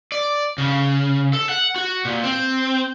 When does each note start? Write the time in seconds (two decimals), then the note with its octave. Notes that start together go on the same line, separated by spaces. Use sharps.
0.12 D5
0.58 C#3
1.33 A4
1.49 F#5
1.76 F#4
2.05 A#2
2.24 C4